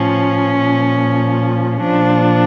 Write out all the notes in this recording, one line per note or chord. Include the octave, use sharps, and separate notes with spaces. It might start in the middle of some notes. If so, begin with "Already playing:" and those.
Already playing: A2 F3 C#4
A#2 F3
A#2 F3 D4